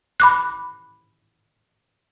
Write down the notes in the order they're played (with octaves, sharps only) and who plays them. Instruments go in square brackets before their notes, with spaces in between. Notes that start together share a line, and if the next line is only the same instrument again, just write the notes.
[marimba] B5 D6 F#6